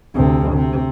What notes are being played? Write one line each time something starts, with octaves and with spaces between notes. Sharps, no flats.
D2 C3
C3